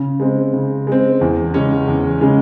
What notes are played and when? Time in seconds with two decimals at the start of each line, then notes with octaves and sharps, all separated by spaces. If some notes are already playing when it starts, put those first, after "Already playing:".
Already playing: C#3
0.20 G#3 C4
0.53 C#3
0.87 G#3 C4
1.21 E2
1.54 C#3 G#3 C#4
1.88 E2
2.21 C#3 G#3 C#4